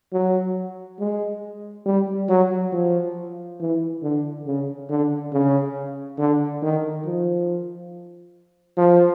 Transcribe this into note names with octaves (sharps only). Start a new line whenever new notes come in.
F#3
G#3
G3
F#3
F3
E3
D3
C#3
D3
C#3
D3
D#3
F3
F3